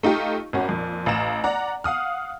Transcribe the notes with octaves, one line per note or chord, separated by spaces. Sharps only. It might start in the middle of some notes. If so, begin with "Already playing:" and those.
A3 D#4 F4 G4
G#1 C#4 F#4
F2 A#2
A1 F5 A#5 E7
D5 F#5 A#5
F5 F#5 D#6 F6